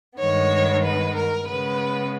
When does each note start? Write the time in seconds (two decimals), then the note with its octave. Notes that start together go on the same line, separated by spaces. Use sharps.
0.18 G2 D#3 G#3 B3 C#5
0.83 B4
1.15 A#4
1.46 C#3 G#3 B3 B4